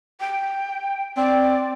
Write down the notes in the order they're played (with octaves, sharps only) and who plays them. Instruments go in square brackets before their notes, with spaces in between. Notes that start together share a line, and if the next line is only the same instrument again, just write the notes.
[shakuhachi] G5
[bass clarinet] C4 [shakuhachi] D5